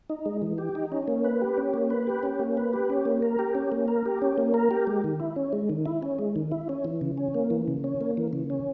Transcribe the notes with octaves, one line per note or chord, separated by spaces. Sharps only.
D#4
G#3
E3
G4
D#4
C#4
A#3
B4
G4
C#4
A#3
B4
G4
C#4
A#3
B4
G4
C#4
A#3
A#4
G4
C#4
A#3
A#4
G4
C#4
A#3
A#4
G4
G#3
D#3
E4
C#4
G#3
D#3
E4
C#4
G#3
D#3
E4
C#4
E3
C#3
C#4
A#3
E3
C#3
C#4
A#3
E3
C#3
C#4